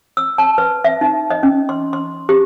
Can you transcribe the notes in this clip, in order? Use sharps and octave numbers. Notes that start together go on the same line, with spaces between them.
E6
A5
B4
E5
D#4
D#5
C#4
C6
C6
G4